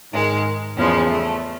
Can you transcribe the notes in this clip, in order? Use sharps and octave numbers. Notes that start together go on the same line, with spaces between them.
G#2 D#3 G#3
E2 C#3 F3 G#3
A3